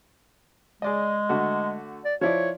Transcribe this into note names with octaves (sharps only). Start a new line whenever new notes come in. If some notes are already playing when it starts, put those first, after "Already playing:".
G#3 G#4 D5 D#5
D3 A3 F#4
D5
F3 E4 C#5 D5